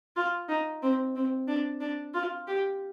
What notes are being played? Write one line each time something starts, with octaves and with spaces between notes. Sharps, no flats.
F4
D#4
C4
C4
D4
D4
F4
G4